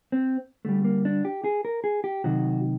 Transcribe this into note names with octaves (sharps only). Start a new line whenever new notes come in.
C4
D3 G3 A3
A#3
D4
G4
G#4
A#4
G#4
G4
C3 D#3 F#3 F#4